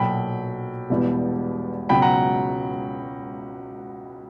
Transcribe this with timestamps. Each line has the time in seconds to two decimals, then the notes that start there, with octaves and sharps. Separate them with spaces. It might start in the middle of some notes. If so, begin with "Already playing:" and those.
Already playing: B1 A#2 F#3 G5 B5
0.90 E1 E2 B2 G3
1.89 C#2 B2 F#3 G5 B5
2.02 F#5 A#5